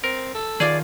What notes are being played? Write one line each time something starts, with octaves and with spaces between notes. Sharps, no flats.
C4 A#4
A4
D#3 F4 G#4 D5